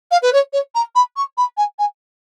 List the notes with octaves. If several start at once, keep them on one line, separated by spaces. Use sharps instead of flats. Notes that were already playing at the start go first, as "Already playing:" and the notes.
F5
B4
C#5
C#5
A#5
B5
C#6
B5
G#5
G#5